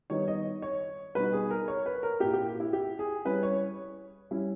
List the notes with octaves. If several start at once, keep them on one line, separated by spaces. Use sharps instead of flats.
D#3 G3 B3 D#4 C#5
D#5
C#5
B2 G3 B3 D#4 B4
G#4
A#4
C#5
B4
A#4
A#2 A#3 E4 G4
G4
E4
G4
G#4
G3 C#4 E4 B4
C#5
G3 C#4 E4